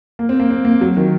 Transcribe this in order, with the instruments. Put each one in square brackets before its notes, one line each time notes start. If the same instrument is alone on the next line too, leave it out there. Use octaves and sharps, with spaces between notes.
[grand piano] A#3
C4
A#3
C4
A#3
F#3
D#3